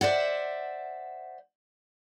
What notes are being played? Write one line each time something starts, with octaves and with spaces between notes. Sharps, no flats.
C5 D5 E5 F#5